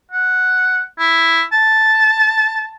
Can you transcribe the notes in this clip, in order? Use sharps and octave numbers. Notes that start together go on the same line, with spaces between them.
F#5
E4
A5